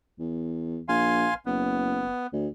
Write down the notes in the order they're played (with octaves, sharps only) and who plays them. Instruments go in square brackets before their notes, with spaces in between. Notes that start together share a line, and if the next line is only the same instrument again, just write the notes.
[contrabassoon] E2
[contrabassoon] A#1 [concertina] F5 G#5 C6
[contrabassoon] F#1 [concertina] B3
[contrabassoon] D2